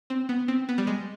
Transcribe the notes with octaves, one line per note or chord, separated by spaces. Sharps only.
C4
B3
C4
B3
G3
G#3